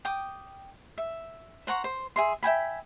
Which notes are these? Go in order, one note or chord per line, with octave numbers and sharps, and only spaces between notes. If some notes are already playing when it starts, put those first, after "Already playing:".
G5 D6 D#6
E5
C5 F#5 A#5 C#6
C5
G#4 E5 C6
E5 G5 G#5 B5